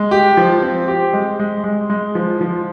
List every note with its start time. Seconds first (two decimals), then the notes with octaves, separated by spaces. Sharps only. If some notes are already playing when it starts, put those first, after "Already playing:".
Already playing: G#3
0.11 G4
0.37 F3
0.62 C4
0.88 G4
1.13 G#3
1.39 G#3
1.64 G#3
1.90 G#3
2.15 F3
2.41 F3